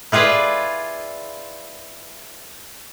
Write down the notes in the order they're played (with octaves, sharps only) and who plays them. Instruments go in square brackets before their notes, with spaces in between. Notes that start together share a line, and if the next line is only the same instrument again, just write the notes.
[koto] E4 F4 G#4 B4 D5